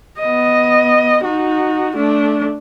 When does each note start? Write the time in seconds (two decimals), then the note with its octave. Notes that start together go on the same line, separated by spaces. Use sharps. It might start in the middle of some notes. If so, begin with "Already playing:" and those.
0.19 B3 D#5
1.24 D#4 F#4
1.96 A3 D4